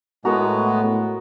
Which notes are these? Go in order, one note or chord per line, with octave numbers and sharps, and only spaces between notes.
A2 G#3 B3 F#4 A#4 A#5